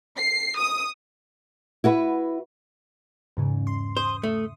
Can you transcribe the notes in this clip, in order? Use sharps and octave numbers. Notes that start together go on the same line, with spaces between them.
C7
D#6
E4 F#4 B4
E2 G#2 C#3
C6
C5 D#6
A3